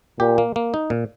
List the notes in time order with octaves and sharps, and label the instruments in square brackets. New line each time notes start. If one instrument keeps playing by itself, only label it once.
[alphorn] A#2 [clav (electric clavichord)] G4
[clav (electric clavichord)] A#3
A#3
D#4
A#2